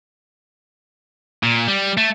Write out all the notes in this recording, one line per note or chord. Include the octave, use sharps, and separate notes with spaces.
A#2
G3
A3